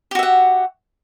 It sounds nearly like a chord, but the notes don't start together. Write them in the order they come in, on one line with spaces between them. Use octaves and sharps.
G4 F#4 E5 F#5